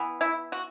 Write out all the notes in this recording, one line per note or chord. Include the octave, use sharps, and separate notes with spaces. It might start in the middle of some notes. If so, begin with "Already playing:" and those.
Already playing: E3 B3
E4
F#4